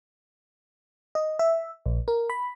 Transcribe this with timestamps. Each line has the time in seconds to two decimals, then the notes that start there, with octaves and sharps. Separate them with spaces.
1.15 D#5
1.39 E5
1.86 A#1
2.08 A#4
2.30 B5